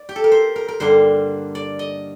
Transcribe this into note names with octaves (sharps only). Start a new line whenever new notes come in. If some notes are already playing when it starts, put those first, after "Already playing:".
Already playing: D5
G4
A4
A#4
C5
A#4
A#4
G2 D3 G3 A#3 C5
D5
D#5